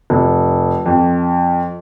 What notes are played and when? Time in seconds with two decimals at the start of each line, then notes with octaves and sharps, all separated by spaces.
0.10 F1
0.86 F2